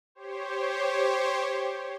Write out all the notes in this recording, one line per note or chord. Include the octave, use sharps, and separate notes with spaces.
G4 C5 C#5